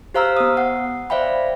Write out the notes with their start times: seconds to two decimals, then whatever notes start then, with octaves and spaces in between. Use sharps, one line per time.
0.14 G4 C5 F5 A#5 E6 F6
0.37 B3 D#6
0.57 F#5
1.10 C5 D5 E5 F5 G5 B5